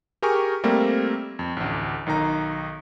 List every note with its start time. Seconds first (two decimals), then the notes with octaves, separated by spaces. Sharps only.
0.22 G4 G#4 A#4 G#5 A#5 C#6
0.64 G3 A3 A#3 C4 A#4
1.39 F2
1.57 A1 D2
2.06 B1 D#3 D#4 A#5